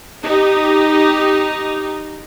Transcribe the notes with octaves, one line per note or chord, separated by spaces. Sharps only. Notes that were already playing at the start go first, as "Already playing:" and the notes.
D#4 G4